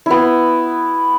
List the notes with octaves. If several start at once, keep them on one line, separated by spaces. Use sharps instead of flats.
B3 E4